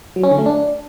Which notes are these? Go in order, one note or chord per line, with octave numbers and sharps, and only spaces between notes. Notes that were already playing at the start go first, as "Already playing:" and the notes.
F#3
C#4
D3
A3
D4